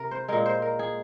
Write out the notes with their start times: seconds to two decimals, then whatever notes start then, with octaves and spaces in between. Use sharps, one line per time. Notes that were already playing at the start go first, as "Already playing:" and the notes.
Already playing: C3 A#4
0.11 C5
0.28 A#2 G#3 A#4
0.46 C5
0.62 A#4
0.79 G#4